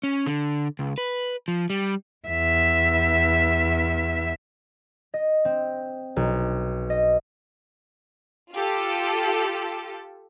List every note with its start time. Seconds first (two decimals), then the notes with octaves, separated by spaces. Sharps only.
0.03 C#4
0.26 D3
0.79 C#2
0.98 B4
1.48 F3
1.70 G3
2.28 E2 E5
5.14 D#5
5.45 C4
6.16 B1
6.90 D#5
8.53 F4 G4 A4